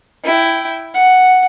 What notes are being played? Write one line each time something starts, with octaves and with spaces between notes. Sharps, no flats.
E4 G5
F#5